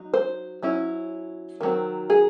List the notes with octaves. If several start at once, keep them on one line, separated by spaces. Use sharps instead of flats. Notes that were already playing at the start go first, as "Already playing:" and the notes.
Already playing: F#3 D#4
C5
F#3 C#4 E4
D#3 F#3 C4
G#4